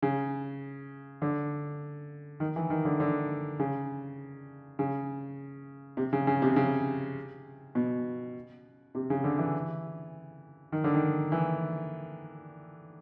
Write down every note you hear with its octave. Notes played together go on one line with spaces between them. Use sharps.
C#3
D3
D#3
E3
D#3
D3
D3
C#3
C#3
C3
C#3
C#3
C3
C#3
B2
C3
C#3
D3
E3
D#3
D3
D#3
E3